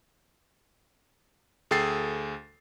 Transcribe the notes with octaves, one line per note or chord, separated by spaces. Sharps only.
D2 G#4 A4 G5 A6 C7